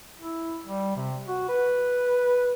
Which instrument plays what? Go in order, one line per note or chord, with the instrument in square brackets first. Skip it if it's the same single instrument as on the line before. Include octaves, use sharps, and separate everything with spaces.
[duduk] E4
G3
C3
F#4
B4